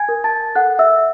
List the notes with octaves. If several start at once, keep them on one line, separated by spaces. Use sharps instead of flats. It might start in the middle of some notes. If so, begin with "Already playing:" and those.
Already playing: G#5 G#6
A#4
A5 A6
A4 F#5 F#6
E5 E6